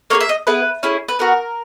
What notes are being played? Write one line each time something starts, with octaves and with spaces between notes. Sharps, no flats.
A#3 E4 G#4 C#5
E5
D#5
B3 E4 G#4 B4
C#4 E4 G#4
B4
B3 F#4 A#4